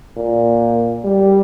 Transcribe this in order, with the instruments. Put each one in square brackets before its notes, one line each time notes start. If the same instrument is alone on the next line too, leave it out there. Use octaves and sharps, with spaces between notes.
[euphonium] A#2
G3